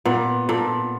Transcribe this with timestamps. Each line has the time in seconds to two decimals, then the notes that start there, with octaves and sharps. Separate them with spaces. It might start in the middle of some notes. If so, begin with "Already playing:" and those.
0.05 A#2 B3
0.49 A#2 A4